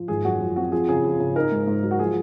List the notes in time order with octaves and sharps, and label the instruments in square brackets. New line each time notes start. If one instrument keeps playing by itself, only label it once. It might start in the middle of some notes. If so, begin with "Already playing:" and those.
Already playing: [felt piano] F3
[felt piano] G#1 [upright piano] G#4
[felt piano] F#2 [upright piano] F#4
[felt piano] F3
[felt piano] C4 [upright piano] F#4
[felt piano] F3 [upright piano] G#4
[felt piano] C#3 [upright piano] G#4
[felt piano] F3
C#3
[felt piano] D#4 [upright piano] A#4
[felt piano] G#2
G#2
F#3
[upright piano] F#4
[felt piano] F3 [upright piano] G#4